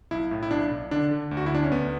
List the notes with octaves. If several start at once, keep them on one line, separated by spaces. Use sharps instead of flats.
B1 E4
A2
E4
B1 D4
B1
D3 D4
D3
D2
F#4
E4
D2 D4
C#4
D2 B3